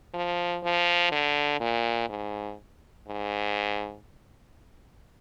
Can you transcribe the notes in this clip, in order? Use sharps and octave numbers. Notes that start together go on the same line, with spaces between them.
F3
F3
D3
A#2
G#2
G#2